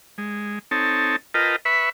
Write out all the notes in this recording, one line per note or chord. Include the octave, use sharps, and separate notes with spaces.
G#3
C4 D#4 A4 C#5 A5
F4 A#4 B4 D#5 G5 A5
B4 E5 B5 C#6